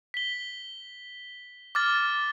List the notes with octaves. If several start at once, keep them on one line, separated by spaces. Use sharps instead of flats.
B6 G7
D6 F6 A6